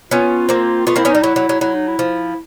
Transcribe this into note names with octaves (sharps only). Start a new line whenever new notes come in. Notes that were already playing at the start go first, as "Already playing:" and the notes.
B3 C#4 F4
A#3 C4
A3 B3 F4
A#3 C4 E4
B3 C#4
D#4
G3
F#3 E4
F#3
F#3
F#3 E4
D#4
E4
F3